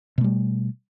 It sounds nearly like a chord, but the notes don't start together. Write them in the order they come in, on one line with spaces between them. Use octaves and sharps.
B2 A3 G3